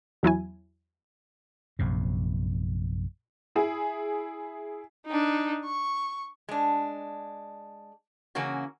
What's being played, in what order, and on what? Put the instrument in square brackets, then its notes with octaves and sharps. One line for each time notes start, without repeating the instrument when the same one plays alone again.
[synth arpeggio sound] E2 F#3 E4 G#5
[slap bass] A#1 F#2 C3
[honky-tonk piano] E4 G#4
[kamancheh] D4 D#4
C#6
[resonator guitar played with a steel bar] G#3 D4
C#3 E3 A#3 C#4 F#4